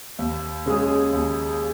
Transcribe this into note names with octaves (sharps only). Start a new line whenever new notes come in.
D#2
C#3 G#3 C#4 G#4
D#2